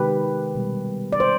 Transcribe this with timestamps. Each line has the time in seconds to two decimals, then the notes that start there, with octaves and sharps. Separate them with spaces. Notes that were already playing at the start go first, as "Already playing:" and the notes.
Already playing: C3 D#3 G#3 G4 B4
0.55 B2 G3
1.13 D5
1.20 C5